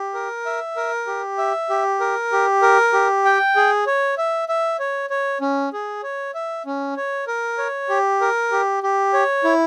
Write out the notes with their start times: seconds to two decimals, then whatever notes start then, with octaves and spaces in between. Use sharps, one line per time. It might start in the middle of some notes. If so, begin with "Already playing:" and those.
Already playing: G4
0.14 A#4
0.46 E5
0.76 A#4
1.07 G4
1.38 E5
1.70 G4
2.00 A#4
2.32 G4
2.62 A#4
2.93 G4
3.25 G5
3.56 G#4
3.86 C#5
4.18 E5
4.49 E5
4.79 C#5
5.10 C#5
5.41 C#4
5.73 G#4
6.03 C#5
6.34 E5
6.66 C#4
6.96 C#5
7.27 A#4
7.58 C#5
7.89 G4
8.21 A#4
8.51 G4
8.83 G4
9.13 C#5
9.44 E4